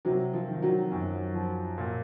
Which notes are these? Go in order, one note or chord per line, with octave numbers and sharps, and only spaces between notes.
C3 F#3
F3
D#3
F#3
F#2
F3
A#2